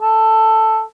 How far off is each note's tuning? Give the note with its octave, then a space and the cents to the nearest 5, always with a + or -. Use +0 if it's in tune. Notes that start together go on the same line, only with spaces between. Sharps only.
A4 +5